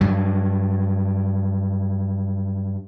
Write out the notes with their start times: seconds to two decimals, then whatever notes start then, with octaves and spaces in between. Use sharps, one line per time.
0.01 G2 F#3